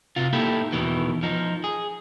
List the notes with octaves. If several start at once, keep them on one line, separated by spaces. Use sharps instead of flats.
C3 F4
A#3 D#4 E4 G4 A4
E2 B2 D#3 E3
F3 D#4
G#4